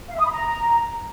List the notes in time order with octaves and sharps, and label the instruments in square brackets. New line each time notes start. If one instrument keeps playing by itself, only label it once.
[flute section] F5
E5
D#6
B5
A#5